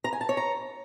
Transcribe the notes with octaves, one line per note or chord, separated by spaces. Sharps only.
A#5
G#5
A5
C#5
A#5